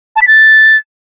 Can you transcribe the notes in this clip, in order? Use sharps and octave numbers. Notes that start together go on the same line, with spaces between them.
A5
B6
A6